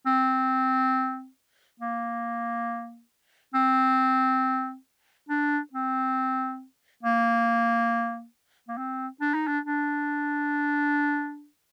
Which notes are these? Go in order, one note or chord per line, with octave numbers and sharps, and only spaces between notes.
C4
A#3
C4
D4
C4
A#3
A#3
C4
D4
D#4
D4
D4